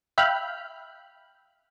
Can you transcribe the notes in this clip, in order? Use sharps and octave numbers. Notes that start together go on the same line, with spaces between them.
E5 F5 G5 B5 F6 F#6